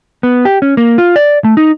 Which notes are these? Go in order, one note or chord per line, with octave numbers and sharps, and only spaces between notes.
B3
G4
C#4
A#3
F4
D5
A3
D#4